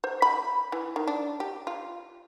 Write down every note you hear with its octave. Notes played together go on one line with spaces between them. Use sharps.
C5
B5
E3
D#3
D4
G4
F4